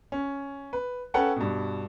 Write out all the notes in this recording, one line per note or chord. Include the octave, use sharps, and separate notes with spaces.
C#4
B4
C#4 A4 B4 F#5 G5 A5
G2 B2